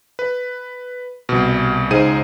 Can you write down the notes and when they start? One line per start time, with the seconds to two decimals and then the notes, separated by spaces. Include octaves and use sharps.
0.19 B4
1.29 C2 B2
1.90 C#2 D#4 G#4 C5 D#7